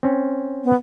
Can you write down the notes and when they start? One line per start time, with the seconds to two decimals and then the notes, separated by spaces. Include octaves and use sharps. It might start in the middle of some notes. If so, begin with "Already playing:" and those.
0.03 C4 C#4
0.64 B3